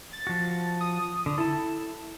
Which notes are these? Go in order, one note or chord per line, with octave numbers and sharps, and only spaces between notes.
A6
F3 F#4
D#6
D3
E4 A4 A5